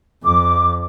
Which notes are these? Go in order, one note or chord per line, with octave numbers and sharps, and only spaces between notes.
F2 D6